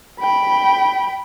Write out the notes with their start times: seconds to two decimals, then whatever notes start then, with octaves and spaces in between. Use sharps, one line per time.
0.20 G5 B5